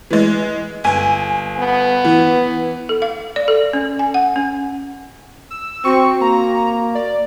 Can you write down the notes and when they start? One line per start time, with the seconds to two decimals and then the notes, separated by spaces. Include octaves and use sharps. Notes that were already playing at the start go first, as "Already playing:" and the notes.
0.11 E3 G#3
0.84 G1 G#5
1.59 B3
2.05 E3
2.89 A4
3.02 F5
3.36 D5
3.48 A4
3.73 C#4
3.99 G#5
4.14 F#5
4.36 C#4
5.50 E6
5.85 C4 F#4 C#6
6.21 A#3 A#5
6.95 D5